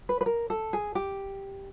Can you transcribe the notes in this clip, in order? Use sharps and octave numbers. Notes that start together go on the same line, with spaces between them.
B4
B4
A#4
A4
G#4
G4